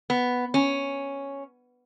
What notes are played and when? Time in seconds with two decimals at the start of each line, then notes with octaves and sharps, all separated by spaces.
0.10 B3
0.54 C#4